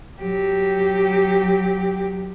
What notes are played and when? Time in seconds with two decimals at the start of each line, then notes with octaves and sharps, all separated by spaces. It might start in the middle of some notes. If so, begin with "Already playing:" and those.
0.22 F#3 G4